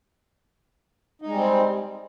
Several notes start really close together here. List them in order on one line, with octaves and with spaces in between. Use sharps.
D#4 G#3 G3 C4